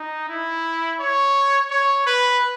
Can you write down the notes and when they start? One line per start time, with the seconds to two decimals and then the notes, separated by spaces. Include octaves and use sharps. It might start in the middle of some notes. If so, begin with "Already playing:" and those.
Already playing: D#4
0.29 E4
1.00 C#5
1.71 C#5
2.07 B4